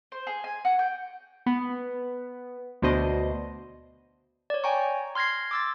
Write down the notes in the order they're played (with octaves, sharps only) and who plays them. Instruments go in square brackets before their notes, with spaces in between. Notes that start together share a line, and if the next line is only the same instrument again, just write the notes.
[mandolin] C5
G#4
G#5
F#4
G5
[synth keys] B3
D2 B2 D4 C5 D#5
[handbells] C#5 D5
G5 G#5 A#5 C#6
C6 F6 G#6 A#6 C7
D6 E6 A6